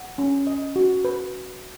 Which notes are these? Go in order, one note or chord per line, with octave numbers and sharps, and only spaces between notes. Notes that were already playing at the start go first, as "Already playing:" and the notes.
Already playing: F#5
C#4
D#5
F#4
B4